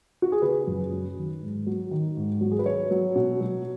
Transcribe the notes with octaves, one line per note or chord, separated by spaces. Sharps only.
F#4
G#4
C#3 B4
F#2
F#3
D#3
G#2
F#3
D#3
G#2
F#3
G#4
B4
F#3 C#5
F#3
B2
F#3